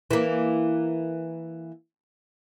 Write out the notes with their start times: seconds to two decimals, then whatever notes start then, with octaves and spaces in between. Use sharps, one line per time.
0.11 E3 A#3